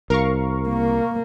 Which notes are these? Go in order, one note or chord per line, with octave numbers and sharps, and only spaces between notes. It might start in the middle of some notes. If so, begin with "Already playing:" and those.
C2 A#4 F5 C#6
A#3